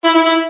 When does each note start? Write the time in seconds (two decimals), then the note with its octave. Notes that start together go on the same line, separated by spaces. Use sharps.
0.04 E4
0.15 E4
0.26 E4